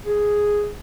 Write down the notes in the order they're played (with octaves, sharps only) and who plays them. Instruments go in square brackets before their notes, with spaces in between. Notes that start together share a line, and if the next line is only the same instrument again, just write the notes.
[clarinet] G#4